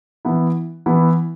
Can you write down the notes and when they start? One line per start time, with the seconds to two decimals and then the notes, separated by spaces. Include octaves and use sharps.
0.25 E3 B3 E4
0.86 E3 B3 E4